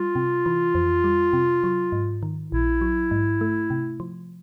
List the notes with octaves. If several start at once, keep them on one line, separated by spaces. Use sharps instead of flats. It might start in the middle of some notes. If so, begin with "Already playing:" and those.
Already playing: G3 F4
C3
E3
F2
G3
C3
F#3
G#2
D#3
A#1 E4
F#3
G#2
A3
C3
F3